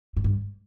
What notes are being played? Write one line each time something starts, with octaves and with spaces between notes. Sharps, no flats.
G#2
G2